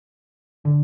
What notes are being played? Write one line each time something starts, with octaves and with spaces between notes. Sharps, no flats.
D3